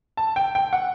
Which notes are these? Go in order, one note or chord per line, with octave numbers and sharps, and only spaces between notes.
A5
G5
G5
F#5